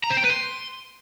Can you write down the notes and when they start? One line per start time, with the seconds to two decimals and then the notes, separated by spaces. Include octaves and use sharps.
0.04 A#5
0.10 C5
0.17 G5
0.24 B4
0.30 C6